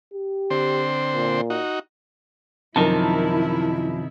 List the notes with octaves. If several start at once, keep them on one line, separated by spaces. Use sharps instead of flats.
G4
D3 C4 C5
A#2
D#4 F#4
F#2 C3 D#3 F3 D#4 E4 A#4 A5